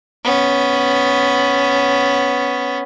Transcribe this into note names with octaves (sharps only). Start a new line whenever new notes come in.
B3 C#4